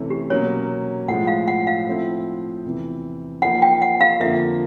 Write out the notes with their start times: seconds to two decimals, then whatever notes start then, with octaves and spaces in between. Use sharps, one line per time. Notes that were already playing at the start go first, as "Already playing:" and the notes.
Already playing: C3 E3 A3 C#4
0.10 G4
0.30 B2 F#3 A#3 C#4 C#5
1.08 A2 F3 G#3 F#5
1.27 F5
1.48 F#5
1.67 F5
1.87 F3 A3 C4 E4
2.64 E2 C3 E3
3.42 F3 A#3 D#4 F#5
3.62 G5
3.82 F#5
4.01 F5
4.20 F2 D3 F3 A#3 E5